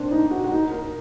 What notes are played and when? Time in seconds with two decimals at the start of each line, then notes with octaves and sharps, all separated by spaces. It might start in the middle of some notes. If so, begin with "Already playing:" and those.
Already playing: C4 D4
0.11 D#4
0.31 F#4
0.44 F#4
0.52 D#4
0.71 A#4